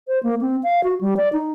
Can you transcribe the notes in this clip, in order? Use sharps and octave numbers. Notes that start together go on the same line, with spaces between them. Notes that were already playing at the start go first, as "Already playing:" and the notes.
C5
A#3
C4
F5
F#4
G3
D5
D#4